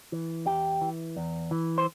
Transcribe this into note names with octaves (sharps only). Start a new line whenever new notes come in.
E3
E2 G4
E3
E2
E3
C5